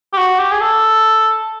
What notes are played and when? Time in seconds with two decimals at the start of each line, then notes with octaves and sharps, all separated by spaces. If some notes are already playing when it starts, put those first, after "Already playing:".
0.13 G4
0.17 F#4
0.39 G4
0.52 G#4
0.61 A4